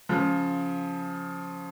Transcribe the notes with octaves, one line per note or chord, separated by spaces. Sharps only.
C#3 F3